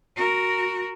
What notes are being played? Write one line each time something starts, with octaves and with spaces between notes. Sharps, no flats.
F#4 A#4